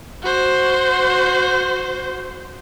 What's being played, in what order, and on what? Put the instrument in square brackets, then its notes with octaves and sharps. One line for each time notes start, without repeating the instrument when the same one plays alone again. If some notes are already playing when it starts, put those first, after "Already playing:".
[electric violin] F#4 C5